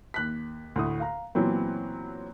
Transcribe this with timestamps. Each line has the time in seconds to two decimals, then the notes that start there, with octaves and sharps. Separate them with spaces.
0.14 D#2 F#6 B6
0.76 D2 A2 D#6
1.00 F5 A#5
1.35 A#2 E3 F#3 B3 C4